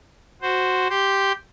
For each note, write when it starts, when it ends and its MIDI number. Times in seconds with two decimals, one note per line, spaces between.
0.42 0.88 66
0.42 0.88 72
0.90 1.32 67
0.90 1.32 84
0.90 1.32 91